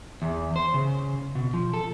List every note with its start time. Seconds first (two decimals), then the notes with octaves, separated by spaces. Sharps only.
0.22 E2
0.56 C5
0.74 C#3
1.35 B2
1.54 F3
1.74 A4